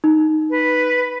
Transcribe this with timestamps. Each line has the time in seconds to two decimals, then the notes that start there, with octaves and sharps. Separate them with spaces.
0.04 D#4
0.50 B4